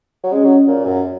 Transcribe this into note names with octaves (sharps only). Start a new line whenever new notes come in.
F#3
G#3 C#4
F#3
A#2
F#2